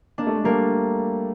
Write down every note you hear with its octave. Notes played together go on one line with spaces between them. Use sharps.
A#3 D4
A3
G#3
G3 A3 A#3